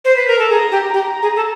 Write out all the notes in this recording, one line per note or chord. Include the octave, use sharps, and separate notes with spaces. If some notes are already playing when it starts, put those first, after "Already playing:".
C5
B4
A#4
A4
G#4 A#5
G4
G4 A#5
G#4
A4